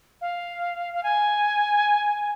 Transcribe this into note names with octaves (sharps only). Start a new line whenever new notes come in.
F5
F5
G#5